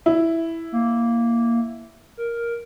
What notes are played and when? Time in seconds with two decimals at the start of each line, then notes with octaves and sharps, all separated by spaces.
0.06 E4
0.72 A#3
2.17 A#4